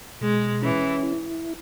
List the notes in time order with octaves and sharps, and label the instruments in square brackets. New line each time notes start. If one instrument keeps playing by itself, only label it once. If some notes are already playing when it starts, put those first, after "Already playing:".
[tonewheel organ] B2 [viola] G#3
[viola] E3 [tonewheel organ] C#4
[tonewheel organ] E4